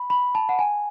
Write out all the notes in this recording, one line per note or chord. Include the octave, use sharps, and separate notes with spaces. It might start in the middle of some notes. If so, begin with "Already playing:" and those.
Already playing: B5
B5
A5
F#5
G#5